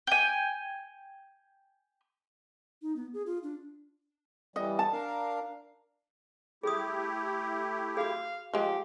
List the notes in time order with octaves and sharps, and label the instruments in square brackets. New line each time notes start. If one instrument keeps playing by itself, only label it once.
[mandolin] G5 G#5
[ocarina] D#4
B3
G#4
F4
D4
[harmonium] E3 G3 [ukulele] D#5
[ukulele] A5
[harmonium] D4 A#4 F5
[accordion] A3 E4 G4 [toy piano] G#4 D#6
[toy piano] F#4 G#4 [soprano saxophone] F5
[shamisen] F3 G#3 [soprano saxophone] G4